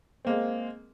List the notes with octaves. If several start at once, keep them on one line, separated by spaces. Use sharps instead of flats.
G#3 A#3 C4